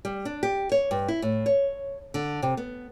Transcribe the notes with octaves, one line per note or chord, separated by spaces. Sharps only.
G3
D4
G4
C#5
G2
E4
A2
C#5
D3
C3
B3